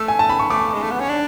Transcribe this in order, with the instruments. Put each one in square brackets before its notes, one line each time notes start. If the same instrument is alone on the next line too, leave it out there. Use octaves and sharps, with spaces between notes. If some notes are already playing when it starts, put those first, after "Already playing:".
Already playing: [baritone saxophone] A3 [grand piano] E6
[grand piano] G#5
A5
B5
C#6
[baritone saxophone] A3 [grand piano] D6
[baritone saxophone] G#3
A3
B3
C#4
D4